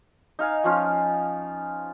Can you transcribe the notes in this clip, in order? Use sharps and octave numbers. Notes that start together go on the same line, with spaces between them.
D#4 F5 G#5
F3 C#4 F4